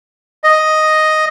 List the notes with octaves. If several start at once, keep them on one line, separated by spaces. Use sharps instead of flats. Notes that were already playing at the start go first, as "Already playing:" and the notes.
D#5